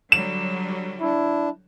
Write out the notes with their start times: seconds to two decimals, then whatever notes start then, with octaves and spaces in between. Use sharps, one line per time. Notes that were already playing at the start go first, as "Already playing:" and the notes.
0.12 D3 F#3 G3 E7
1.01 D4 E4